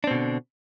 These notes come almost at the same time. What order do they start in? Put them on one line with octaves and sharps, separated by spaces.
D4 C4 B2 D3